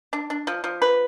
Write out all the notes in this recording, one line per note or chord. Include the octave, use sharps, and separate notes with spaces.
D4
D4
F3
F3
B4